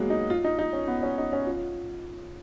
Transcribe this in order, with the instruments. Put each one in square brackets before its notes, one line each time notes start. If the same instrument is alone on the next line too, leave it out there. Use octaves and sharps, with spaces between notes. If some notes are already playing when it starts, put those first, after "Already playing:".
Already playing: [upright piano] F#3 G#3 A#3 B3
D#4
F4
D#4
D#4
C#4
B3
C#4
D#4
C#4
F4